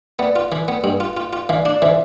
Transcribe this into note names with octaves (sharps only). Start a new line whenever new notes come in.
B3 B4 D5
F4
E3
B3
G2
F4
F4
F4
E3 D5 F5
D4
D5
E3 C5 E5